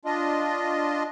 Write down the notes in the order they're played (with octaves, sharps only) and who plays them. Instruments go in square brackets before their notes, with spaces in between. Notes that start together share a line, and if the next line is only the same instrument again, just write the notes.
[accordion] D4 F4 D#5